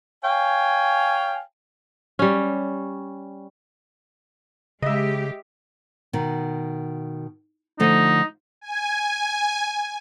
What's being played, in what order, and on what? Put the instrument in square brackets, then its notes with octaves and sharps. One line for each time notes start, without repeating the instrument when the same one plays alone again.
[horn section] C#5 F5 G5 G#5
[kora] G3 C#4
[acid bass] C#3 [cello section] G#3 G4 [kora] D#5 E5
[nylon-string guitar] B2 D#3
[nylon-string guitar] D3 F3 A3 [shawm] D#4
[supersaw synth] G#5